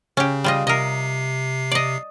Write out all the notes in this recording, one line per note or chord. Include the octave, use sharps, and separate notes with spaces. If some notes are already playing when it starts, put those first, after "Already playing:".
C#3 C#4 G4
G3 F4 D#5
C3 A#4 D#5 C7
D5 D#5